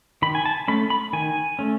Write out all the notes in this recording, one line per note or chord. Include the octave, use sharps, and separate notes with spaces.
D#3 B5
G#5
A5
A3 C#4 B5
B5
D#3 G#5
A3 C#4